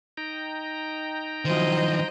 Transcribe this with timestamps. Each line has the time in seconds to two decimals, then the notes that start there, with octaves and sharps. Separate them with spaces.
0.17 D#4 G5 A#5
1.45 D#3 F3 F#3 C5 D#5